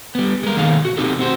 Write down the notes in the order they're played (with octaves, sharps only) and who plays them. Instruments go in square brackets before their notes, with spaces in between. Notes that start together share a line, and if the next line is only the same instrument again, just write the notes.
[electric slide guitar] G3 B3
G#3 A#4
B2 D#3 A#3 D#4 A4 F5
F#4
B2 F#3 C4 D#4 G4 A4
C4 F#4 C5